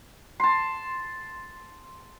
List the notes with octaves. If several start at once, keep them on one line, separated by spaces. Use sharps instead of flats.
A5 C6